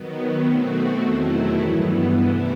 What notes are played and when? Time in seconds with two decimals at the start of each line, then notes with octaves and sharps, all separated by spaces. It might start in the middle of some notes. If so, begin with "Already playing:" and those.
Already playing: D#3 F#3 B3
0.44 B2 A3 C4 F#4
1.03 E2 D#3 F#3 A3 E4
1.61 G2 E3 B3
2.18 C3 E3 A3 E4